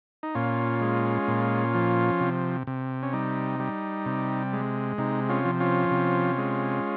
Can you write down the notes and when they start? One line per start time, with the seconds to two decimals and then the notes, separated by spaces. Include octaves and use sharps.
0.23 D#4
0.35 A#2 C#4 F4
0.81 G#3
1.28 A#2
1.74 F3
2.20 C3
2.67 C3
3.03 C#4
3.13 G3 D#4
3.60 G3
4.06 C3
4.53 G#3
4.98 C3 D#4
5.29 C#4 F4
5.45 F3
5.60 C#4 F4
5.91 C3
6.38 G#3